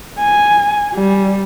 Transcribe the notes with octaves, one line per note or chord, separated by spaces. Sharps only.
G#5
G3